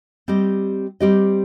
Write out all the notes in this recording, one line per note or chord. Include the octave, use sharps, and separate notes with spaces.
G3 C4 G4 D#5
G3 C4 G4 D#5